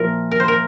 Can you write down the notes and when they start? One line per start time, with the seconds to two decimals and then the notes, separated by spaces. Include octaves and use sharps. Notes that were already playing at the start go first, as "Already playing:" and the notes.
Already playing: A#2 F3 A#3 E4 A#4
0.31 A#4
0.40 C5
0.48 A#4